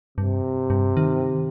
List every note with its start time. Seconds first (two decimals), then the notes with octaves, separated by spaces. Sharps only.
0.18 G2 C3
0.70 G2
0.97 D#3